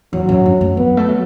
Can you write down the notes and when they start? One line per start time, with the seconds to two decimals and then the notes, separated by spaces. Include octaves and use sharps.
0.13 E2 F#3
0.29 F#2
0.46 F#2
0.61 A3
0.77 F#3 B3
0.97 A3
1.08 F#3